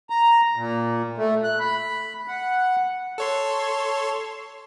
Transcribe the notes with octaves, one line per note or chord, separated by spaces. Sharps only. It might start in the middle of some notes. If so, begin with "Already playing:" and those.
A#5
A#2
A3
F#6
B5
F#5
A4 C#5 C6